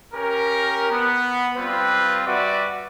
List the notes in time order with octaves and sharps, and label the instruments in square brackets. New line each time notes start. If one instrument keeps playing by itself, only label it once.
[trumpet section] C#4 G4 A#4
B3
G3 C4 F4 B4
G3 F#4 B4 D5 E5